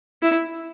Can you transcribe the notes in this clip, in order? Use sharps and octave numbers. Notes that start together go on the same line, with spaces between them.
E4